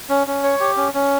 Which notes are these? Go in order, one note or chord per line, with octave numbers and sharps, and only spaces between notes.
C#4
C#4
C#5
G4
C#4
C#4